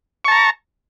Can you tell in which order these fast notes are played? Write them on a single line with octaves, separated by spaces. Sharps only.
C#6 A5 A#5